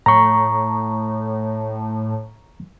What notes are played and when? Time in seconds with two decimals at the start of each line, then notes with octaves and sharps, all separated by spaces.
0.06 A2 A#5 C#6